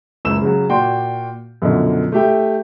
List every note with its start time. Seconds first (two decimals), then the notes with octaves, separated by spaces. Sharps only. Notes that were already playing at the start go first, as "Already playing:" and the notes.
0.25 F#1 C#2 E6 E7
0.41 C#3 F#3
0.69 A#2 F#4 D5 G5 C6
1.62 F#2 B2 D3 F3
2.12 A3 E4 G4 E5 G5